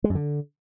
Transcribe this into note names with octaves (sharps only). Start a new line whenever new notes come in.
G#3
F#2
D3